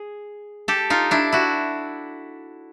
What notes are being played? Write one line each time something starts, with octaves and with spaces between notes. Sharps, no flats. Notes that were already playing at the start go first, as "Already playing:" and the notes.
Already playing: G#4
G4 A4
D#4 F4
D4 E4
E4 F#4